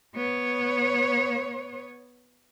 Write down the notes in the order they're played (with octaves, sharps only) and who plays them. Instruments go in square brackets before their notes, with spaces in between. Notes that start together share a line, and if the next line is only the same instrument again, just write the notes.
[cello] B3 C#5